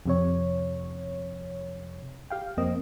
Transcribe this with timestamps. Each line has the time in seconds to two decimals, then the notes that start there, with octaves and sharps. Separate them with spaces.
0.06 F2 C3 C#5
2.30 G4 F5 G5
2.57 F2 A#3 C4 D#5